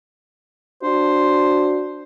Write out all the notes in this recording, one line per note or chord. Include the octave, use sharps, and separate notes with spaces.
D4 F#4 C5